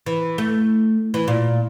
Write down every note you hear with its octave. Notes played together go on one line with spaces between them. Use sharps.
E3
A3
E3
A#2